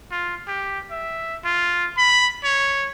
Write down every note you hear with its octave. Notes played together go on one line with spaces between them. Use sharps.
F4
G4
E5
F4
B5
C#5